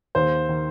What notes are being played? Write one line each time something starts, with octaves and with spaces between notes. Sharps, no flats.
D#2 C5
D#3